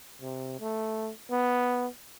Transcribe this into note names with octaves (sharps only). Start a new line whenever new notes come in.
C3
A3
B3